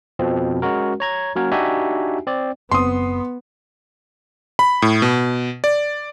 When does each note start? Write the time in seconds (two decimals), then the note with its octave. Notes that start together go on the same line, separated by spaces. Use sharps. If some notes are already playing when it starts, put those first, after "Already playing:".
0.19 F2 B2 F3 C4
0.62 G#3 C#4 F#4 A#4
1.00 C#5 A#5 G#6
1.36 F#3 A#3 C#4 F#4 A#4 C#5
1.52 D4 D#4 F#4 G4 E5 G#5
2.27 C4 D5
2.72 F#1 B3 C4 C6 D#6
4.59 B5
4.82 A2
5.02 B2
5.64 D5